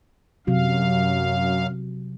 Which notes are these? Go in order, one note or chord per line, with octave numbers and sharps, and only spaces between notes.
F#2 C3 F#3 F#4 F5